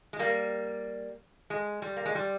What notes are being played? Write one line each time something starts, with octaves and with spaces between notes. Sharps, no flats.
G#3
G3 A#3
G#3
G3
A#3
G#3
G3